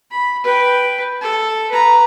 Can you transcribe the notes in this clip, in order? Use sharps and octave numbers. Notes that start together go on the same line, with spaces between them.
B5
B4 G5
A4
B4 A#5